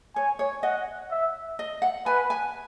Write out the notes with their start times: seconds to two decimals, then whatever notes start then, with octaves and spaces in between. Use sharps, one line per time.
0.15 C#5 G#5
0.39 C#5
0.63 D#5 F#5
1.11 E5
1.59 D#5
1.82 F#5
2.06 B4 G#5
2.30 G#5